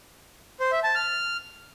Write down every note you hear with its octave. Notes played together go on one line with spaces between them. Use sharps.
C5
E5
A5
F6